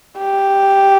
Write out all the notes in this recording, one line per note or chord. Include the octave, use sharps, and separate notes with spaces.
G4